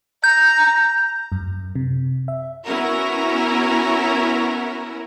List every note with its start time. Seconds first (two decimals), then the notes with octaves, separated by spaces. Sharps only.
0.24 A#5 G6
1.32 F#2
1.76 C3
2.28 E5
2.66 B3 C#4 E4 F#4 A#4